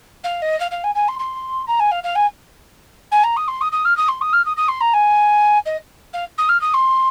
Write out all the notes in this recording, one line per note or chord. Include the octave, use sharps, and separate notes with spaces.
F5
D#5
F5
F5
G#5
G#5
C6
C6
A#5
G#5
F5
F5
G#5
G#5
A#5
D#6
C6
D#6
D#6
F6
D#6
C6
D#6
F6
D#6
D#6
C6
A#5
G#5
D#5
F5
D#6
F6
D#6
C6